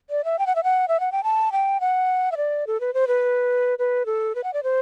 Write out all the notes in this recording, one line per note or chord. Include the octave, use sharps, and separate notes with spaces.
D5
E5
G5
F#5
E5
F#5
E5
F#5
G5
A5
G5
F#5
E5
D5
A4
B4
C5
B4
B4
A4
B4
F#5
D5
C5